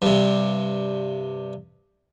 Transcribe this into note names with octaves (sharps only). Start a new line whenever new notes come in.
G2 C3